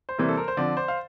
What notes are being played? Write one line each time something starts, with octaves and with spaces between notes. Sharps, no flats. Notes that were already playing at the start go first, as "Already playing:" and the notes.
C5
C3 E3 G3 A#3
A4
A#4
C5
D3 F3 C4 D5
C5
F5